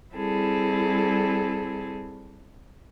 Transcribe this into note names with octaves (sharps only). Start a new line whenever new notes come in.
G3 C4 E4 G#4 A4